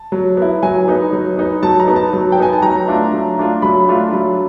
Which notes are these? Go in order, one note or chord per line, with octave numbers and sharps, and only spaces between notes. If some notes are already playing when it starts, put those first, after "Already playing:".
Already playing: A5
F#3
B3 E4
F#3 G#5
B3 D#4
F#3
B3 D#4
F#3 A5
A#5
B3 D#4
A5
F#3
G5
B3 D#4 G#5
A5
F#3 A#5
A3 D4 F4
F#3
A3 D4 F4
F#3 B5
A3 D4 F4
F#3